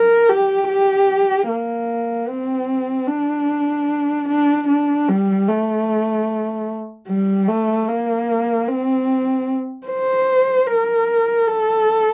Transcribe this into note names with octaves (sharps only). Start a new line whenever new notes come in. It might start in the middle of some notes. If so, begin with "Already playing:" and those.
Already playing: A#4
G4
G4
A#3
C4
D4
D4
D4
G3
A3
G3
A3
A#3
C4
C5
A#4
A4